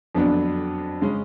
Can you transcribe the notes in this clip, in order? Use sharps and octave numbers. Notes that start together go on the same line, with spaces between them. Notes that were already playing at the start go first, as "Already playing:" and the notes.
F2 D3 F#3 B3 D4
C#3 G#3 C#4